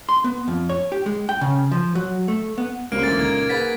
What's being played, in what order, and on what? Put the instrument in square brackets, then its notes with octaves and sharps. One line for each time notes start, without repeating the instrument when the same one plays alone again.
[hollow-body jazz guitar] C6
B3
F2
C#5
G4
G#3
G5
C#3
F3
F#3
A3
B3
[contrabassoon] C#2 [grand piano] F#3 G3 C5 [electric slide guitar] A#3 [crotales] D7
[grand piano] D2 D3 E3 [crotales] A6
[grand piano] A#2 D#4 [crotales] G#6
[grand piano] G#4 B4 F#5 [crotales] A6 B6